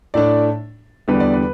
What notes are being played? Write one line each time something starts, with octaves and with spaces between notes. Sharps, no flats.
A2 A3 D4 D5
E2 D3 G3 B3 B4
D5
B4